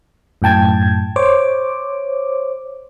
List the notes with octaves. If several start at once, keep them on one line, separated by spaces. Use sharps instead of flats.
F#2 A2 G5 A5 G#6
C5 C#5 D6